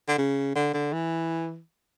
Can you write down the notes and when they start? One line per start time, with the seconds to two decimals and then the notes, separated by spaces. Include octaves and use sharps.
0.08 D3
0.18 C#3
0.55 D3
0.74 D3
0.93 E3